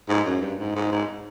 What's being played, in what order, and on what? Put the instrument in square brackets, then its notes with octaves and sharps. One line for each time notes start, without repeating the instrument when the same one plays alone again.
[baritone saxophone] G#2
F#2
G2
G#2
G#2
G#2